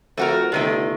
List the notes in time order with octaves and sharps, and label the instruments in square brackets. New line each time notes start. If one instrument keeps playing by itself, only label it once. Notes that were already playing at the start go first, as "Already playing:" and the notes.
[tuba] F2 [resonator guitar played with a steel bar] A3 F#4 A#4
[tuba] G1 [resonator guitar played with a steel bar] C3 D#3 A3